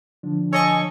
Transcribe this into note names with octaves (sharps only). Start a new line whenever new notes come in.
D3 F3 D4
A4 C#5 D#5 G#5 C#6